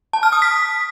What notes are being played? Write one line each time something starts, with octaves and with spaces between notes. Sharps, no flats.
A5
F6
D#6
B6